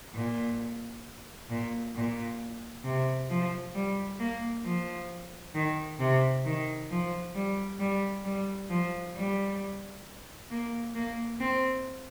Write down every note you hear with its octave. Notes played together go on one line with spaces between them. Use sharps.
A#2
A#2
A#2
C3
F3
G3
A#3
F3
D#3
C3
D#3
F3
G3
G3
G3
F3
G3
A#3
A#3
C4